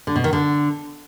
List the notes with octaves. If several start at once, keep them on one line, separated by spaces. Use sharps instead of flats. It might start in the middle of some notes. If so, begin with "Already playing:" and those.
D3
B2
D#3
D3